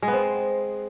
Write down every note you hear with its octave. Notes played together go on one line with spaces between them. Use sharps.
G#3
B3
C4